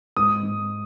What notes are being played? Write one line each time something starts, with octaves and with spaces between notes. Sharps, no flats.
G#2 D#6
G#2